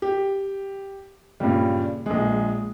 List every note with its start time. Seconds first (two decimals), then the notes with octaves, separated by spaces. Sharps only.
0.02 G4
1.40 G2 A#2 C#3 G3
2.06 A#1 G#3